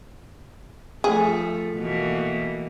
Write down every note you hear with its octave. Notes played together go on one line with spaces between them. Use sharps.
F3 A3 G#4
B2 E3 A#3